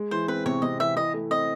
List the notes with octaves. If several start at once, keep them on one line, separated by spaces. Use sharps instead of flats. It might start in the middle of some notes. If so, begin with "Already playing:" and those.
Already playing: G#3
E3 C5
C4 B4
C3 C#5
C3 D#5
E3 E5
E4 D#5
A3
C4 D#5